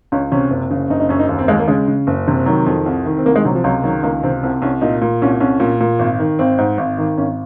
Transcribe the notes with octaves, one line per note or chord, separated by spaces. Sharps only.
C#2 C#4
C3 C#4
F#1
C#3
F#1 D#4
D#4
F#2 C#4
D#4
D#2
C4
D#2 G#3
A#3
C#3 G#3
C#3
F#1
C3
D#3 F#3
F2
C2
D#3
C4
C2 A#3
G#3
C3 F#3
F3
C#2 F#3
D#3 F#3
C#2 A#3
C3 C4
C2 C4
C2 C#4
A#2 D#4
A#2
C2 C#4
C2 C#4
A#2
A#2
G#1
D#3
G#1 C4
G#2
G#1
D#3
G#1 C#4